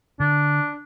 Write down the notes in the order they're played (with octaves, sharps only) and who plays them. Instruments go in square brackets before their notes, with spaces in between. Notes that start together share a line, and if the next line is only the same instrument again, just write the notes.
[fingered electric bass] D3 [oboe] D4